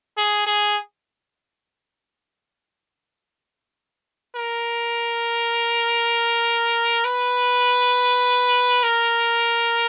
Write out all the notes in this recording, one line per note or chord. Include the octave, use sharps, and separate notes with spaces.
G#4
G#4
A#4
B4
A#4